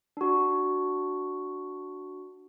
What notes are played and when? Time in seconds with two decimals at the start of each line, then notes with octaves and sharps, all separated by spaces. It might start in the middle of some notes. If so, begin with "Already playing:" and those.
0.17 D4 F#4